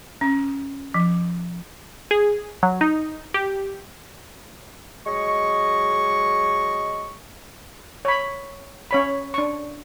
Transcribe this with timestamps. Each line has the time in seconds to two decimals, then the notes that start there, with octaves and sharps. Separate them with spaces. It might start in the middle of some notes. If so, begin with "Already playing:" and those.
0.21 C#4
0.94 F3
2.11 G#4
2.63 F#3
2.81 D#4
3.34 G4
5.07 F#3 G#3 D#5 C#6
8.05 C#5 B5
8.91 C#4 C#5 B5
9.34 D4 C#6